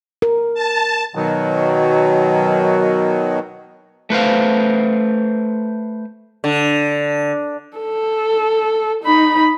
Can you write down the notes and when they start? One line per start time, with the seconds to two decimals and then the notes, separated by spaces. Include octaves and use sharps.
0.22 A#4
0.54 A5
1.15 B2 D#3 F#3
4.10 A3 B4 C5 F5
6.44 D3
7.77 A4
9.04 D#4 B5